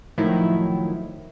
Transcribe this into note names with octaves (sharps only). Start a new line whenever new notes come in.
A2 D#3 F3 F#3 E4